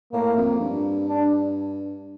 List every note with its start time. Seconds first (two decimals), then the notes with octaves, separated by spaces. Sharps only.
0.12 A2 A#3
0.36 F2
0.60 G2
1.07 D4